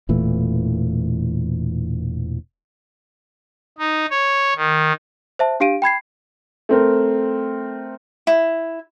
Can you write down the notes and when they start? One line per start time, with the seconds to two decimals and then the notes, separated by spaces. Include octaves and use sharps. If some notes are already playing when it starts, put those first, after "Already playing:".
0.09 E1 A#2 E3 A3
3.78 D#4
4.11 C#5
4.56 D#3
5.39 C5 E5 A5
5.60 D4 G4 F5 D7 D#7
5.82 G5 B5 G#6 C7
6.69 A3 C4 A#4
8.27 E4